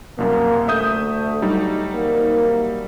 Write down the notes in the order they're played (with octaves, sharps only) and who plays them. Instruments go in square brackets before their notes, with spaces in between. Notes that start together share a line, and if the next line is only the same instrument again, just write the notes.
[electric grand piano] C2 F#2 [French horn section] A#3
[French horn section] D2 A3 [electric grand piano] E5 D#6 G6
[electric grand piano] F#3 G3 D#4
[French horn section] C3 D#3 A#3